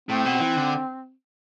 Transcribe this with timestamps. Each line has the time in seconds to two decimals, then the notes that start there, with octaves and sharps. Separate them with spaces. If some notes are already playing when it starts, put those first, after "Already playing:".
0.09 A2 C4
0.25 B2
0.40 E3
0.56 D3